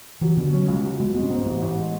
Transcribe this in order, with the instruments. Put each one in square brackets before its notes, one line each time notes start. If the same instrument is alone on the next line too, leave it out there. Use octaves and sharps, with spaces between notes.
[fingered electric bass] E3 [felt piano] F#3
[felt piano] B2 [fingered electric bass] D3
[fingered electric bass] F#3 [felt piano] C#4
[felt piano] C#2 [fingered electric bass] G#3
[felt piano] F#3
[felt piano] B2 [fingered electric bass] G#3
[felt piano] G#3 [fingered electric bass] B3
[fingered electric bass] C#4
[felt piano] G#2 [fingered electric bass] B3
[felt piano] A1 [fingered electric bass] B3
[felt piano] A1
G#3